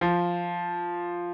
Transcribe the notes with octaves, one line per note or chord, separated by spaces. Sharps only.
F3